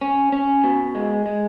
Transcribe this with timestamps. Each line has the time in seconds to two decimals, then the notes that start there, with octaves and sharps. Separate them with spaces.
0.01 C#4
0.32 C#4
0.64 B2
0.95 G#3
1.26 G#3